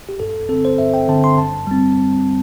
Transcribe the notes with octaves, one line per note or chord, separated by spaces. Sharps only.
G4
G2 A4
D3 C4 A4
C5
G2 E5
G5
D3 C4 A5
C6
G2 A5
G3 C4